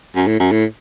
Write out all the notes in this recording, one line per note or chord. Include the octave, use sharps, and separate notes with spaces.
F#2
A2
F#2
A2